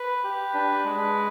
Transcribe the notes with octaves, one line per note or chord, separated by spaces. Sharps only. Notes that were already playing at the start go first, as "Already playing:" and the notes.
Already playing: B4
G4
D4
G#3